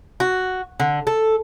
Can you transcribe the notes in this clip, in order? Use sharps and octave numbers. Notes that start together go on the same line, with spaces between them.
F#4
D3
A4